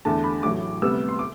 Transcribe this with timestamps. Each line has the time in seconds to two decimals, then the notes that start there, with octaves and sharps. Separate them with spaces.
0.05 E2 D3 A3 A5
0.24 B5
0.43 A1 A2 F#3 D6
0.82 D2 C3 G3 B3 E6
1.09 C6
1.19 D6